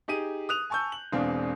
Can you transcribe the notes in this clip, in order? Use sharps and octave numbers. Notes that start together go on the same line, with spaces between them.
D#4 G4 G#4 D#7
D#6 F#6 F7
G#5 A5 C#6 E6 G6
F#7
E1 E2 C4 D4 F5